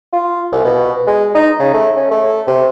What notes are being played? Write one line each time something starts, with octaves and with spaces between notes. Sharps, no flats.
F4
C2
B2
G#3
D#4
C#3
A3
C#4
A3
C3